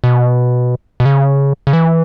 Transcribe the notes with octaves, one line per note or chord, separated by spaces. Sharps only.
B2
B2
C#3
C#3
E3